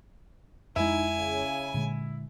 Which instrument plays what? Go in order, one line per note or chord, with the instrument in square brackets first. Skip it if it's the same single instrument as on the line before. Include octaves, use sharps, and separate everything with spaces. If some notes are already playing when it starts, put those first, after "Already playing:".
[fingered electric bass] F2 G#3 [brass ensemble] D#4 [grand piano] E4 [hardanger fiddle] G#5
[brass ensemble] C#3
[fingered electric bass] A#2 D3 G#3